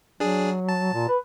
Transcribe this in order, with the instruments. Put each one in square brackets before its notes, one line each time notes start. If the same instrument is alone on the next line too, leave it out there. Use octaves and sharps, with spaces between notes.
[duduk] F#3 [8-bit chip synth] D4 G#4
[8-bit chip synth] A5
[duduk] A#2
B4